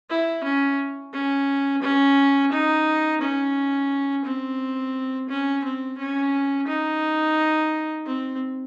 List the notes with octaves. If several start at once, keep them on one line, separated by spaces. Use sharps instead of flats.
E4
C#4
C#4
C#4
D#4
C#4
C4
C#4
C4
C#4
D#4
C4